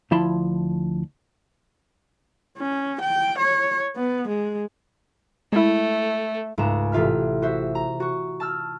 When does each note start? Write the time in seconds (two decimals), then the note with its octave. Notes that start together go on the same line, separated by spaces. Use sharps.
0.11 D2 F3 E4 A5 B5 C6
2.58 C#4
3.01 G5
3.38 C#5
3.96 B3
4.28 G#3
5.52 G#3 A3 E4
6.58 C#2 G#2 A3 A#5 E7
6.92 A1 C3 F4 E5 F6
7.42 F#4 C5 E5
7.75 A#5
8.00 F#4 C#6
8.40 A5 E6 F6